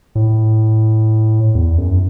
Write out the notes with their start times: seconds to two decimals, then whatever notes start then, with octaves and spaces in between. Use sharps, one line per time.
0.15 A2
1.55 E2
1.78 F#2